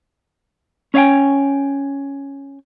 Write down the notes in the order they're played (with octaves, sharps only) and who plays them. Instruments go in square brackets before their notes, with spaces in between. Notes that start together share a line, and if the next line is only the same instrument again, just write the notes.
[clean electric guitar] C#4 C#5 D#5 F5 G5 G#5